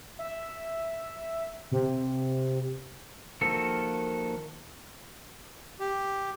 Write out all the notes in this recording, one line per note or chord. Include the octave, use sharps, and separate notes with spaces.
E5
C3
D#3 F3 A#3 F#4 A4
G4